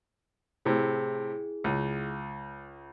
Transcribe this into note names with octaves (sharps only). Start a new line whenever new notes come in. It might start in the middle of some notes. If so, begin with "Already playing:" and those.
A2 C3 E4 G#4
C#2